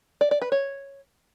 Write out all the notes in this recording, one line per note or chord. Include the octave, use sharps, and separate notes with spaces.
D5
D5
B4
C#5